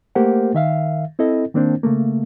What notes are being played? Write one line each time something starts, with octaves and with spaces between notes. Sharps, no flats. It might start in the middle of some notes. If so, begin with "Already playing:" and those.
A3 A#3 G4 A#4 C5 F#5
D#3 E5 F5
C4 E4 A4 D#5
D#3 A#3 C4 D4 C5
C#3 A3 A#3